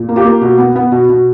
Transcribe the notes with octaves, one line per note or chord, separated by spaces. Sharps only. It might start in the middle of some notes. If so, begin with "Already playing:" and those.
Already playing: A#2
A#3
F4 G4
A#3
B2
B3
B3
B2
B2